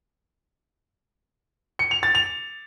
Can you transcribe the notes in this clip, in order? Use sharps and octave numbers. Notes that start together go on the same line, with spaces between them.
C#7
F7
A6
F7